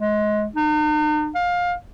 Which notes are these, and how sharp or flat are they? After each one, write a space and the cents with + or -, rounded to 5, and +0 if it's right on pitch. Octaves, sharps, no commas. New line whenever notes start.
G#3 +25
D#4 -45
F5 +20